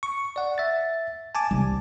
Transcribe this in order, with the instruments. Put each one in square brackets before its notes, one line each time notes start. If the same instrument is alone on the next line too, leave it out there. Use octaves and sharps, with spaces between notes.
[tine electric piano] C#6
D5 F#5
E5 A6
G#5 A5 D6
[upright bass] C2 [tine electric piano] G3